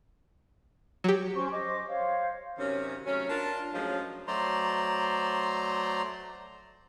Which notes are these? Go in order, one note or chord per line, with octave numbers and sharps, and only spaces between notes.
F#3 G4
C#4 C5 C#6
C5 D#5 D6
C5 C#5 F5
F#2 C3 D#3 C#4
C3 F#3 A3 C#4
D4 F4 A#4
A2 F3 F#3 G#3 C#4 F5
F#3 A3 C5 D5 A#5 C6